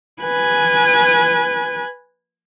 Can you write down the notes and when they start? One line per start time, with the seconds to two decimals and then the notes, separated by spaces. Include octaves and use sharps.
0.22 B4 G#5